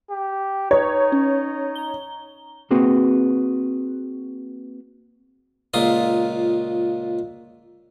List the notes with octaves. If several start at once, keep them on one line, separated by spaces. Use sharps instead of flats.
G4
D#4 B4 C#5
C#4
A#5 G7
A#3 C4 F#4 G#4 B4
C#2 A#2 F4 D#6